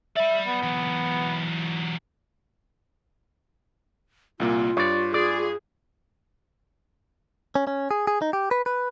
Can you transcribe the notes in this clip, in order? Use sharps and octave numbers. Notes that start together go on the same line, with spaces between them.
D5 E5 B5
B3
E3 F#3
C2 A#2 A#3 F4
G2 C#5 D5
G#4 D5
C#4
C#4
G#4
G#4
D#4
G4
B4
B4